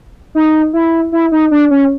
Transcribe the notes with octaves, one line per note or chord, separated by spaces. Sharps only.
D#4
E4
E4
D#4
D4
C#4